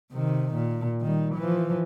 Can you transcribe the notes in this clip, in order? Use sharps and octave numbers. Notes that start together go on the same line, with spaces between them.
C3 D#3
A#2
D#3 G3
E3 F3